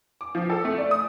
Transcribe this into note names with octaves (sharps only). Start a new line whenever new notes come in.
D6
F3
A4
A3
D5
D#6